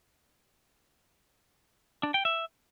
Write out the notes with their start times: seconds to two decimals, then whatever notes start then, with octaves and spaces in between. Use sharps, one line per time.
2.03 D4
2.14 G5
2.25 E5